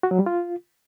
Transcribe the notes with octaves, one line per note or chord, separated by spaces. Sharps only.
F#4
F#3
G3
F4